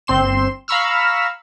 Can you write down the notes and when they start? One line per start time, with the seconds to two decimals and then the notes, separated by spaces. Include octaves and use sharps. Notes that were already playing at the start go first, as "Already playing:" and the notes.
0.07 G1 C4 C6 E7
0.68 F5 A#5 B5 C#6 E6 F6